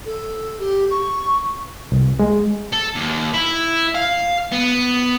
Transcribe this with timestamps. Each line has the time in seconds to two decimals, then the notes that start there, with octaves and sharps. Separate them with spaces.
0.06 A4
0.60 G4
0.91 C#6
1.92 C2
2.19 G#3
2.72 A4
2.95 D#2
3.34 E4
3.95 F5
4.52 B3